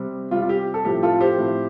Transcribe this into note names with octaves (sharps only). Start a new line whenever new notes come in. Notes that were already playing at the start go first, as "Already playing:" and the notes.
Already playing: C3 G3 C4
C3 G3 C4 F4
F4
G4
A4
A2 F3 C4 G4
F4 A4
G4 C5
A2 F3 C4